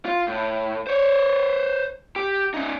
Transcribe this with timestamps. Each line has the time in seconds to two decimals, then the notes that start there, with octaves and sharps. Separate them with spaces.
0.06 F4
0.28 A2
0.87 C5 C#5
2.16 G4
2.54 C#4 D#4